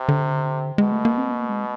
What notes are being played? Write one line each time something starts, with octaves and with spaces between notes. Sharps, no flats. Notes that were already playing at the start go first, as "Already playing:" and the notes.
Already playing: C3
D3
B2 G#3
A3
A#3
C4
A#3
G#3